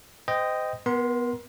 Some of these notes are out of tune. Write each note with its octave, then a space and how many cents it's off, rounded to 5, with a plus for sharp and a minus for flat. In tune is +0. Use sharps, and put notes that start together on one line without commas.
C5 -35 D#5 +0 G5 +0
B3 +0 A#4 +40 C6 -5